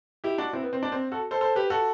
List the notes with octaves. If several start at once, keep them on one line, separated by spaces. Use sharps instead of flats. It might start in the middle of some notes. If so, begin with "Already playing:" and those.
E4 G4
D4 F#4
C4 E4
B3
C4
D4
C4
F#4 A4
A4 C5
A4 C5
G4 B4
F#4 A4